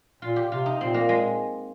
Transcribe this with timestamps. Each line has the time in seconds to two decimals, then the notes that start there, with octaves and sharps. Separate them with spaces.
0.22 A#2 F4
0.36 G4
0.51 C3 F4
0.66 D#4
0.80 A#2 C4
0.94 A#3
1.09 G#3